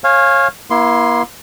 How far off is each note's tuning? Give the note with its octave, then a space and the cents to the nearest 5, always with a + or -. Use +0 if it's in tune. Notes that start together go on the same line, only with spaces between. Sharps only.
C#5 -25 F5 +0 G#5 +0
A#3 +40 E4 +0 C6 +0